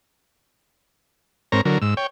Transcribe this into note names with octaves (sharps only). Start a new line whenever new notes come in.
G#2 C4 A#4 C#5 A#5
D3 F#3 A#4
G#2 E6
C#5 G5